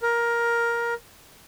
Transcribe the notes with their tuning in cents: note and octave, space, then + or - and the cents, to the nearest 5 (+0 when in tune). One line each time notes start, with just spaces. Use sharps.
A#4 +10